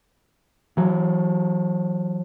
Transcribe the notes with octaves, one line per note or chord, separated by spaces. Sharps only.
E3 F#3